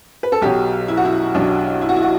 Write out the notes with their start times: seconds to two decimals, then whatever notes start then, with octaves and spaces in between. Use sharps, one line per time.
0.23 B4
0.32 A4
0.41 B1 B2 F#3 G4
0.88 E4
0.97 F#4
1.05 E4
1.34 B1 B2 F#3 D4
1.81 E4
1.89 F#4
1.96 E4
2.03 F#4